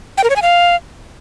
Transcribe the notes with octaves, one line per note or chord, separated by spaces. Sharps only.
G5
A#4
C#5
G#5
F5